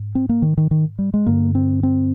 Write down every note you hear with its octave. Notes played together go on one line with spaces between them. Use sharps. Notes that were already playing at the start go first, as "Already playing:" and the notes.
Already playing: G#2
C4
A#3
D#3
D#3
D#3
G3
G#3
G2 D3 A#3
C4
C4